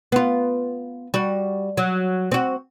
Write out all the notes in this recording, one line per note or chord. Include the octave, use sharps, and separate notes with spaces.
B3 F4
G3 F#4
F#3
C4 F#4